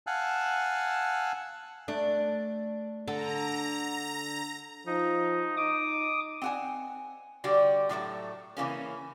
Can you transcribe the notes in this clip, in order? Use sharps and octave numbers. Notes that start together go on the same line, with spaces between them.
F5 F#5 G#5 A5 E6 F#6
A3 D4
D3 A4 A#5
F3 D#4
D#4 D6 D#6
C4 F#5 G#5
D3 G3 F#4 D5 G5
A2 F#3 G#3 A3
C#3 E3 A#3 C#4